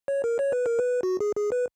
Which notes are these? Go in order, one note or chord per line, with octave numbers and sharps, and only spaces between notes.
C#5
A#4
C#5
B4
A#4
B4
F#4
G#4
G#4
B4